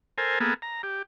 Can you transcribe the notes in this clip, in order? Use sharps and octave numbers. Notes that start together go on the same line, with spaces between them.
A4 A#4 C5 G#5
A#3 B3 G#4 A4
A#5
G4